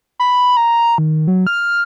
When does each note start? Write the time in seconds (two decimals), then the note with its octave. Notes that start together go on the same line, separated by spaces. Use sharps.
0.20 B5
0.57 A#5
0.98 D#3
1.27 F#3
1.47 F6